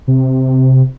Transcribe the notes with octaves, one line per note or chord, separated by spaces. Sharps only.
C3